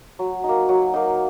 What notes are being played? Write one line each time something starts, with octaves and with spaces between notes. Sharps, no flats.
F#3
D#4
A#3
F#3
A#3 D#4